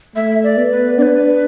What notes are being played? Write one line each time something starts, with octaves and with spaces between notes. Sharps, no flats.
A3 E5
D5
B3
B4
D4 B4 D5